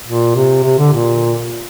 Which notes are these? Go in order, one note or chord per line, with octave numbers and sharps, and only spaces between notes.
A#2
C3
C3
D3
A#2